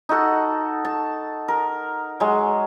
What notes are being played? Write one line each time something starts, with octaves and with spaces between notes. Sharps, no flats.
D#4 F#4 A4 F#5
A5
A#4
F#3 G#3